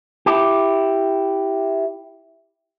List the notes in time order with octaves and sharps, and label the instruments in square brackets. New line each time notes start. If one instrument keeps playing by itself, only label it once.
[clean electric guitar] E4 G4